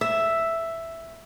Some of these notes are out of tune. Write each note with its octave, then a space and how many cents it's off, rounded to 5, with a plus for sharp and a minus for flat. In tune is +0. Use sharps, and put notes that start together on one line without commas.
E5 +5